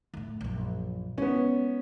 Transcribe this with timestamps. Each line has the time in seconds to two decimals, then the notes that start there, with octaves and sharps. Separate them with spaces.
0.14 E2 A2
0.41 A#1 F#2
1.18 G#3 B3 C#4 D#4